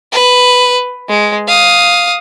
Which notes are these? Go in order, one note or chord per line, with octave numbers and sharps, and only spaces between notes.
B4
G#3
F5 D#6